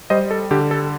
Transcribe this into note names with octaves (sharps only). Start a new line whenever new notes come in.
G3 C5 D#5
A4
D3 G4
A4